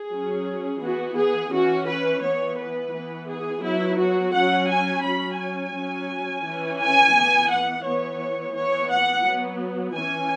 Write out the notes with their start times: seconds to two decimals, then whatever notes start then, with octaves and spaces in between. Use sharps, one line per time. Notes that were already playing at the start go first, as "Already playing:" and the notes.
Already playing: G#4
0.13 F#3 C#4
0.83 E3 B3 F#4
1.18 G#4
1.53 E3 C#4 F#4
1.88 B4
2.24 E3 B3 C#5
2.59 B4
2.94 E3 B3
3.29 G#4
3.64 F#3 B3 E4
3.99 F#4
4.34 F#3 C#4 F#5
4.70 G#5
5.04 F#3 C#4 B5
5.39 G#5
5.75 F#3 C#4
6.45 E3 C#4
6.80 G#5
7.15 E3 B3
7.50 F#5
7.85 E3 B3 C#5
8.55 E3 B3 C#5
8.91 F#5
9.26 F#3 B3
9.96 E3 C#4 G#5